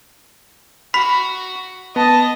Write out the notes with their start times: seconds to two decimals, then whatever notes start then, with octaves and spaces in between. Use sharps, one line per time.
0.94 F#4 B5 B6
1.96 B3 D#5 A5